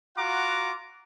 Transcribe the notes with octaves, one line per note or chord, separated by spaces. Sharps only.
F4 F#4 F#5 A#5 D6